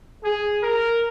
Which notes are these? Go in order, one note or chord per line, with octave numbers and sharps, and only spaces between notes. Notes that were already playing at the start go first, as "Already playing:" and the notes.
G#4
A#4